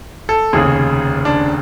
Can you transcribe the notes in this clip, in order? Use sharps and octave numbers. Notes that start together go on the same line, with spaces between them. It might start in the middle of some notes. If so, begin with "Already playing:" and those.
A4
F1 D#2 C#3 G#4
D4